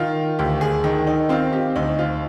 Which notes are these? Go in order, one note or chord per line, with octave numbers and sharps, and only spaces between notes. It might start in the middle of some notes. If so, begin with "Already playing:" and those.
Already playing: D#3 F4
D2 G4
G#4
D#3
D#4
C4 F4
G4
D2 D#4
F4